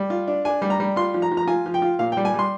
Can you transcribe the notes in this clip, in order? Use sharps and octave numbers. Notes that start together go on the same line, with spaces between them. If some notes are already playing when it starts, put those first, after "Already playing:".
Already playing: G3
F4
D4
D4 G#5
G3
A#5
G3
F4 C6
F3
A#5
F3
A#5
F4 G#5
F3
G5
F4
A#2 F5
G5
G3
G#5
G3 C6